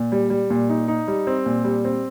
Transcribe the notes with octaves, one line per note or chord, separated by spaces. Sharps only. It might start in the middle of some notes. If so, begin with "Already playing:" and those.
Already playing: A#2
G3
G3
A#2
D#4
D#4
G3
C4
A#2
G3
C4